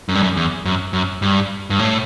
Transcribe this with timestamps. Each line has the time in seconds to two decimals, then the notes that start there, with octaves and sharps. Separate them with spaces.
0.09 F#2
0.15 G2
0.23 F#2
0.37 E2
0.65 F#2
0.93 F#2
1.22 G2
1.70 G2
1.79 A2